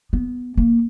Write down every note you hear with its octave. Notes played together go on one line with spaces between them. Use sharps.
B3
A#3